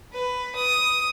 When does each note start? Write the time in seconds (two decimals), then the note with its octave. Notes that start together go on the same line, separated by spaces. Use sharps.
0.13 B4
0.55 D#6